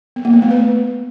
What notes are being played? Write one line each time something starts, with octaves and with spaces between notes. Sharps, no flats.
B3
A#3
B3
A3
B4